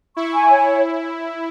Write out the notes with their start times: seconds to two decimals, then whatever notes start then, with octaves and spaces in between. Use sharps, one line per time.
0.17 E4 C#6
0.33 G#5
0.49 C#5